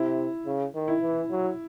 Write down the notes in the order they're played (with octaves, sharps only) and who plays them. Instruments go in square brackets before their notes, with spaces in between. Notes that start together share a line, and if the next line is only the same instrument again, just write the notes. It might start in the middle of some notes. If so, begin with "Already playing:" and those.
Already playing: [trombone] C3 [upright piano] E4
[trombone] C#3
D#3
[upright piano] E4
[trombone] E3
F#3